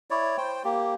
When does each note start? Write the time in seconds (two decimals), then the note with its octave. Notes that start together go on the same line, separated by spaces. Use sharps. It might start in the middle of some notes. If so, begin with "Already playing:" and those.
0.10 E4 C#5 D5
0.38 C5 G5
0.64 A#3 G4